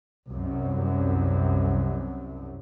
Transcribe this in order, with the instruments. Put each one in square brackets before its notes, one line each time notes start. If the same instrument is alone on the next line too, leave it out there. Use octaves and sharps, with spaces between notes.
[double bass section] C2 F#2